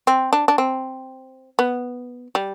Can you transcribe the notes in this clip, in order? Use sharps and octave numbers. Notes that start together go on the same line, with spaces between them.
C4
D4
D4
C4
B3
G3